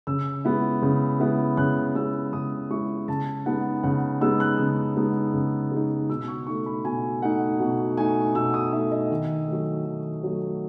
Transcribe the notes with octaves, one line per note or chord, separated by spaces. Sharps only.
C#3 E6
G#3 B3 E4
C#3
G#3 B3 E4
C#3 F#6
G#3 B3 E4 E6
C#3 D#6
G#3 B3 E4 C#6
C#3 A5
G#3 B3 D#4 F#5
C#3 F#5
G#3 B3 D#4 E6
F#6
C#3
G#3 B3 D#4
C#3
G#3 B3 D#4
B2 E6
C#6
A3 D#4 C#6
B5
B2 G#5
A3 D#4 F#5
B2
A3 D#4 G#5
B2 E6
D#6
A3 D#4 E5
D#5
D#3
F#3 A3
D#3
F#3 A3